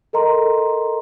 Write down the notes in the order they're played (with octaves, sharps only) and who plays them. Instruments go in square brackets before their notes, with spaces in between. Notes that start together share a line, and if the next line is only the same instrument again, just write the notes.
[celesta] A4 A#4 D#5 A#5 C6